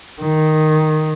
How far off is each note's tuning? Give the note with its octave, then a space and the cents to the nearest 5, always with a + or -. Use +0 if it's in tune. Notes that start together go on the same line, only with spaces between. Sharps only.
D#3 -5